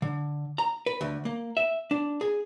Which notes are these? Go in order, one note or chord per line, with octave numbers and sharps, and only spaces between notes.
D3
A#5
B4
D2
A#3
E5
D4
G#4